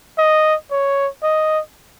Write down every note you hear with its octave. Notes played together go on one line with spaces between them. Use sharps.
D#5
C#5
D#5